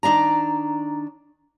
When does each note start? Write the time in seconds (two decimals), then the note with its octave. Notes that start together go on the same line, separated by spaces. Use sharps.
0.03 D#3 D4 D5 A#5